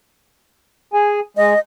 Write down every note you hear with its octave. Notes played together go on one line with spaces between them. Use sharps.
G#4 G#5
G#3 D#5